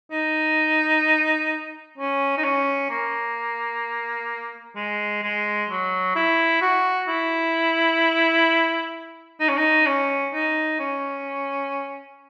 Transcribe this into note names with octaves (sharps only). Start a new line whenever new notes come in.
D#4
C#4
D#4
C#4
A#3
G#3
G#3
F#3
E4
F#4
E4
D#4
C#4
D#4
C#4
D#4
C#4